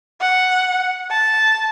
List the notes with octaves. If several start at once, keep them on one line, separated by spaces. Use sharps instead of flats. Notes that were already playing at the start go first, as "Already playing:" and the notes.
F#5
A5